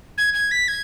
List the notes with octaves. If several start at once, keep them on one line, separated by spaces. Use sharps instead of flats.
G#6
G#6
B6
G#6